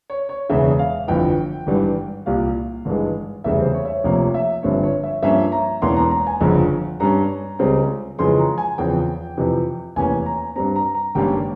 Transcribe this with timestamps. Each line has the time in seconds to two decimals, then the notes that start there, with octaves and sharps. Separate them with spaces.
0.10 C#5
0.29 C#5
0.50 E1 E2 C#3 E5
0.79 F5
1.08 G1 F2 E3 G5
1.67 G#1 G2 E3 G3
2.26 C2 A#2 G3 F5
2.85 G#1 G2 E3 G#3
3.44 F1 E2 C#3 G3 E5
3.60 C5
3.74 C#5
3.85 E5
3.89 C#5
4.04 F1 F2 C3 F3 A#3 C#5
4.34 E5
4.63 G1 G2 F3 C4 C#5
4.83 C#5
5.03 E5
5.23 G2 F3 A#3 C#4 E5
5.52 A#5
5.82 E1 E2 E3 A#3 C#4 C6
5.96 A#5
6.11 A#5
6.27 G#5
6.40 G1 F2 C#3 F3 A#5
7.00 G2 G3 C#4 A#5
7.59 C#2 C#3 G3 C4
8.19 F2 C#3 E3 G#3 C6
8.39 A#5
8.58 G#5
8.78 E2 C#3 F3 C4 G5
9.37 F2 C3 E3
9.96 F1 E2 E3 A#3 C#4 G#5
10.26 A#5
10.56 G2 G3 C4 A#5
10.76 A#5
10.95 A#5
11.15 G#1 G2 G3 A#3 C#4 G5